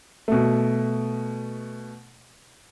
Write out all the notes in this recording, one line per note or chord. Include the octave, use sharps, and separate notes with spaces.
B2 A3